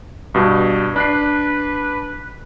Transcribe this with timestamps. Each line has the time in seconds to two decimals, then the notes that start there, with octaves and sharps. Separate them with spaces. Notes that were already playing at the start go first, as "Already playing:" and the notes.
0.34 G2 B2
0.96 D4 B4 F#6 C7